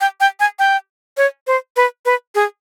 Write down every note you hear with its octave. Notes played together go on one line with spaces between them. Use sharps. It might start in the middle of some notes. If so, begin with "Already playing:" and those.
G5
G5
G#5
G5
C#5
C5
B4
B4
G#4